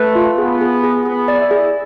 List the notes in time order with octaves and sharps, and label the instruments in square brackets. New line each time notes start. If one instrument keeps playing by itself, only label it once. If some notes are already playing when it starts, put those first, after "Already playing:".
Already playing: [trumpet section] A3 [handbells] B4
[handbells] F4
[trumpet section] B3 [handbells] G#4
[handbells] G#4
G#4
[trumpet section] B3 [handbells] G#4
[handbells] D5
[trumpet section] E4
[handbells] G#4